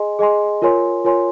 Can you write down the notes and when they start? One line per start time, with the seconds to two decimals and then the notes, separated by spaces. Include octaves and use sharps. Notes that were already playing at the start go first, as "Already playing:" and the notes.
Already playing: G#4 D#5 G#5 C6
0.19 G#4 D#5 G#5 C6
0.62 F4 A#4 C#5 G#5 C6
1.04 F4 A#4 C#5 G#5 C6